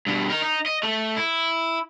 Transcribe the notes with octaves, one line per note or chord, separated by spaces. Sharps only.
G2 B2
D#4 A#4
D#4
D#5
A3
E4